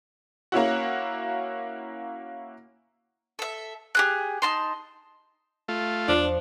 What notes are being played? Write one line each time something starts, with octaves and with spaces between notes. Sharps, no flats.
A#3 C#4 E4 F#4
A4 E5
G4 G#4 F#6
D#4 A5 C6
A3 F4
E2 F3 D4